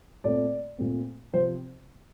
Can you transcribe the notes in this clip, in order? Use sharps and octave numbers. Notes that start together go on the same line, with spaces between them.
A#2 A3 C4 D5
A#2 A3 C4
C3 F3 C4 C5